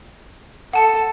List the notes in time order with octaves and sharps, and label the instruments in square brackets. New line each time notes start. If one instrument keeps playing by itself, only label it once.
[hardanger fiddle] A4 [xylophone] F#5 A5 C#7